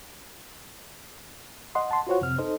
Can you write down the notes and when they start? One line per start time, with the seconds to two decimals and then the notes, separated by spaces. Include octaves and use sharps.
1.75 D#5 F#5 C6
1.89 F#5 A5 C6
2.07 F4 F#4 C5 C#5 F#5
2.21 F2 C3 C4 F6
2.38 D#4 A4 C5 D#5